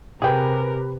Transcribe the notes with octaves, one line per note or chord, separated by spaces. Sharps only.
C3 G4 G#4 A#4 B4 G5